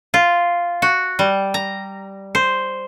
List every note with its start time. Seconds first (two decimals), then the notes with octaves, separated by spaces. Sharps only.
0.14 F4
0.82 F#4
1.19 G3
1.54 A#5
2.35 C5